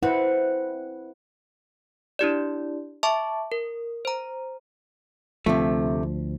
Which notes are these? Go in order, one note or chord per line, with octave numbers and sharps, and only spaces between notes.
C4 E4 B4 F#5
D4 E4 G4 D5
E5 A5 C#6 D6
A#4
C5 A#5
D2 C3 F3 A3